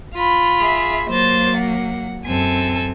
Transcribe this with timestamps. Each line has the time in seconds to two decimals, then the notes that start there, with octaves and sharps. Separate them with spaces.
0.14 F4 B5
0.60 G#4 E5
1.10 F#3 A#3 C5 A6
1.57 F#5
2.26 F#2 C4 A4 G#5